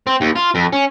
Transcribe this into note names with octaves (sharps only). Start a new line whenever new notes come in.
C4
D#2
F4
F2
C#4